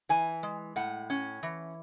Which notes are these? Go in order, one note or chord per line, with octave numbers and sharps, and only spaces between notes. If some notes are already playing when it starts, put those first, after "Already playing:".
E3 G#5
G#3
A2 F#5
C#4
E3